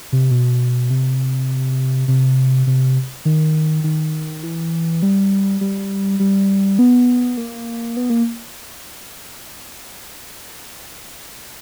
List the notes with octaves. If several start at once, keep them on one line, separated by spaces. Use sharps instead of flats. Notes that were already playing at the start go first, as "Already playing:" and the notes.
C3
B2
C3
C3
C3
D#3
D#3
E3
G3
G3
G3
B3
A#3
B3
A#3